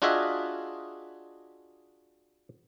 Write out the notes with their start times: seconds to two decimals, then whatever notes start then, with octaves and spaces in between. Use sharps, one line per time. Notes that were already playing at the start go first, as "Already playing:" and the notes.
0.02 D4 F4 F#4 G#4 D#5 E5